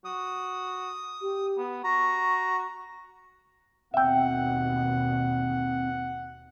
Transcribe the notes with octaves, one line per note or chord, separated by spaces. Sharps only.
F#4 D#6
G4
B3
F#4 A#5 C#6
D#2 B2 C4 E5 F#5 G5